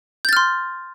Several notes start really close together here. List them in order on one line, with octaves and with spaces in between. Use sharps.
G6 A6 F6 C6